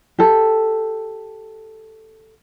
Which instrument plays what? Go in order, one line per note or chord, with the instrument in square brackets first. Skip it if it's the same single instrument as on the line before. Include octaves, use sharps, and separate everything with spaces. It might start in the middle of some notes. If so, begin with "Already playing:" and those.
[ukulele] G4 A4